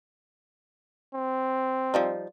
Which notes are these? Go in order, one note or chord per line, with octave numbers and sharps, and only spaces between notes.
C4
F3 G3 D#4